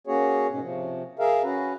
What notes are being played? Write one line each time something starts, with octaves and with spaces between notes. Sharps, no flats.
A#3 C#4 F#4 G#4 C#5
G#2 B2 C#4
C3 F3
G#4 A#4 E5 F5
C#4 F#4 B4